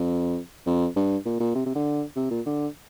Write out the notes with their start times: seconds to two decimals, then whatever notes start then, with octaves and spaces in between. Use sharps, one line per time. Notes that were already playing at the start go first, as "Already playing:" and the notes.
Already playing: F2
0.66 F2
0.96 G2
1.25 A#2
1.40 A#2
1.55 C3
1.66 C3
1.75 D3
2.16 C3
2.30 A#2
2.46 D3